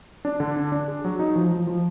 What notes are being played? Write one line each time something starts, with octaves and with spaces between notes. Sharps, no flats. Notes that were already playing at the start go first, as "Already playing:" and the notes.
D4
D3
D4
D4
G#4
F#3
D#4
F3
F3
F3